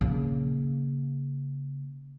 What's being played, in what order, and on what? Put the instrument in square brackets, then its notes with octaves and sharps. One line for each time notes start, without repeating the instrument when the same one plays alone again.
[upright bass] C#3 A#3